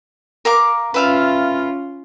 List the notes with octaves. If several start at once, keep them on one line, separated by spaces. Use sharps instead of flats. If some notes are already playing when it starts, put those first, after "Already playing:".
A#4 F5 D6
C#4 F4 B4 E5 F5